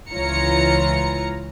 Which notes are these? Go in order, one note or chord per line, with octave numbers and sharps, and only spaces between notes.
C#2 E3 F4 C#5 A#5 C#7